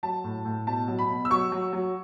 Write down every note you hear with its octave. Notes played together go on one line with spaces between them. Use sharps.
F#3 A5
A2
A2
B2 A5
F#3
B5
B2
E6
F#3 C#6
F#3
F#3